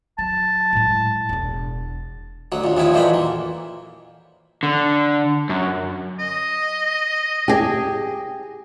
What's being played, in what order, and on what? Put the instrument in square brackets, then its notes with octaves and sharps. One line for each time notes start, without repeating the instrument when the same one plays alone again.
[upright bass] F#3 [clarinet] A5
[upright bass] A2 G#3
E1 D4
[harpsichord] D2 F#3
D#2 A#2
F#2 A#2 D#3 F3 E4
F2 A#2 E3 F#3 C5 B5
A#3
[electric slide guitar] D3
F#2
[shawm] D#5
[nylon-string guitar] G4 G#4